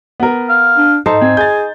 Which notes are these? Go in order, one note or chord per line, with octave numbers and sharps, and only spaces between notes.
B3 A#4
F5
D4
G#2 D#4 A4 C5 A5
C4 G#5
G#4 G6 A6